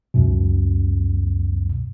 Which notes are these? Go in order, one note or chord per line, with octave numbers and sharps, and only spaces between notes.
C#2 F#2 B2